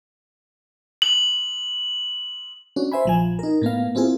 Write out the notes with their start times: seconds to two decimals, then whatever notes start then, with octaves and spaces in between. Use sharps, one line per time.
1.02 F#7
2.76 C#4 D4 F#4
2.92 C5 E5 G#5 B5
3.05 A#1 F3 G#5
3.39 D#4 A#4
3.62 A2 A#3 B3 F5
3.95 A#3 C4 E4 F4 G#4